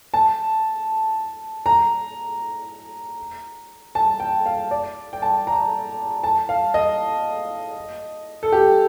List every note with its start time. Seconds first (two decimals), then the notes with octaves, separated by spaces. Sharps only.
0.14 A5
1.66 A#5
3.95 A5
4.20 G5
4.46 F5
4.71 D5
5.13 G5
5.22 A5
5.47 A#5
6.24 A5
6.49 F5
6.74 D#5
8.43 A4
8.52 G4